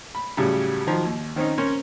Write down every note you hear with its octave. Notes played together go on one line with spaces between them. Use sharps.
B5
A2 C#3 F#3 G3
D#3 F3 F#3
D#2
D#3 C4 C#4 D#4
C4 C#4 A#4 C5